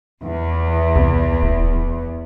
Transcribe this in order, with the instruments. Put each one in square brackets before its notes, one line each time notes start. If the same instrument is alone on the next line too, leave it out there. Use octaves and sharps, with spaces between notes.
[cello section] E2
[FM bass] C2
D1